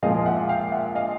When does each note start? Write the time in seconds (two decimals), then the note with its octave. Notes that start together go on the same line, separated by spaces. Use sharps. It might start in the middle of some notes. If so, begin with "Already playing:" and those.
0.03 A#2 F3 G#3 D#5 F5
0.20 F5
0.26 E5 F#5
0.49 F5 G5
0.72 E5 F#5
0.95 D#5 F5